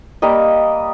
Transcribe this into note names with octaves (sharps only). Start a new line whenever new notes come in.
G3 A#3 D#5